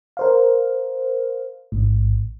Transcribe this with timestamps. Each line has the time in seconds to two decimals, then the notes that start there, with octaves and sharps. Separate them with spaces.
0.17 A#4 C5 F5
1.72 A1 G#2